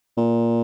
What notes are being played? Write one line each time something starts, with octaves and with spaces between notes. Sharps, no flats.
A#2